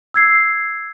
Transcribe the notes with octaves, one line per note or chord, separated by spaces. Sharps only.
E6 G#6 C7